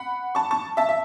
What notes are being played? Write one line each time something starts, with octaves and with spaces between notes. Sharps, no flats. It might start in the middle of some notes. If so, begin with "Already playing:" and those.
Already playing: F#5 B5
A5 C#6
A5 C#6
E5 A5
E5